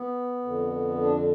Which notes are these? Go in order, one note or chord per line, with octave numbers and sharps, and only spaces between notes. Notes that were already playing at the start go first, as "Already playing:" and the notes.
Already playing: B3
F2 D3
D4